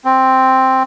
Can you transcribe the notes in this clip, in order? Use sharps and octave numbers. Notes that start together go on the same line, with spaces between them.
C4